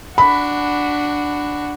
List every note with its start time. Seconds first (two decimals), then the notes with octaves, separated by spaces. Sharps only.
0.18 D4 F#4 B5